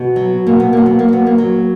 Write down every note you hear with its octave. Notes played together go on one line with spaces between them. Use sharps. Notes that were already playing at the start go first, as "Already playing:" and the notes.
Already playing: B2
F#3
B2 A#3
B3
F#3 A#3
B3
A#3
F#3 B3
A#3
F#3